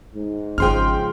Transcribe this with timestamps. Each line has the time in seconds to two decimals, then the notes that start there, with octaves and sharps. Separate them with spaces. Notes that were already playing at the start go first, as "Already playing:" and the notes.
0.15 G#2
0.58 G#1 C#3 F3 C#4 G#4 G5 C6 F6